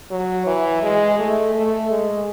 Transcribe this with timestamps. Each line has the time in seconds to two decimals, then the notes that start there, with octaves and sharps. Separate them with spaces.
0.11 F#3
0.47 E3
0.83 G#3
1.19 A3
1.55 A3
1.91 G#3